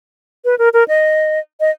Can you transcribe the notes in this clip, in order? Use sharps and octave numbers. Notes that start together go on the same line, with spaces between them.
B4
A#4
A#4
D#5
D#5